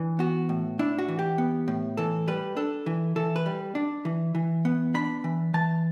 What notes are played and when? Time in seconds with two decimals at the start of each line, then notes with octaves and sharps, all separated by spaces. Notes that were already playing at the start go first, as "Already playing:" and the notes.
Already playing: E3 D4
0.19 B3 F#4
0.49 A2
0.79 D4 E4
0.98 F#4
1.08 E3
1.19 G4
1.38 B3
1.68 A2
1.97 E3 A4
2.28 G3 B4
2.56 D4 A4
2.86 E3
3.16 E3 A4
3.36 B4
3.46 G3
3.75 D4
4.05 E3
4.35 E3
4.65 B3
4.94 D4 B5
5.24 E3
5.54 E3 A5